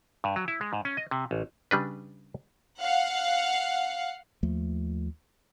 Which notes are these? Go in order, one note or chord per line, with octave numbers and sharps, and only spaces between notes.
G2
F#3
E4
G#3
G#2
C#4
D#5
C3
A1
C#3 G3 D4 B4
F5 F#5
D#2 F3 A3